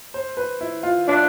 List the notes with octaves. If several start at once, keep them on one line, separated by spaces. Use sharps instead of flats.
C5
B4
E4
F4
D4 F4